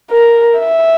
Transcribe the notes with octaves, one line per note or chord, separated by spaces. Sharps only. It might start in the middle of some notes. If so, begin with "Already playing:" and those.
A#4
E5